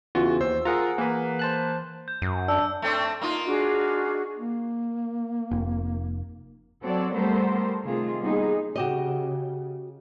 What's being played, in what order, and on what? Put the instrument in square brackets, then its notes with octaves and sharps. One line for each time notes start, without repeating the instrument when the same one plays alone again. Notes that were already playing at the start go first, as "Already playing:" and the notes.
[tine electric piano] E2 C#3 E3 [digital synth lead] F4 [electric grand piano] F#4
[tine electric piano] D#2 [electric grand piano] C5 [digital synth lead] E6
[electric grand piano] F4 A#4 [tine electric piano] G#4 F#5 A#5
[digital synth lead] E3 [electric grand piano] A#3 B4
[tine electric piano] C5 A5 F#6
[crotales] G6
[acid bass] F#2
[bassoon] D4 [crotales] E6
[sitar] A3 C4 D4
A#3 D#4 F4
[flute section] D4 F#4 G#4
[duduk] A#3
[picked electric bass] F1
[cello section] F#3 C4 F#4 A4 C#5 D5
G3 A3 B3 A4 A#4 C5
C3 D#3 A3 F4 G#4
G3 A#3 B3 D#4 G#4
[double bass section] C#3 [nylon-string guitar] F#4 G4 D#5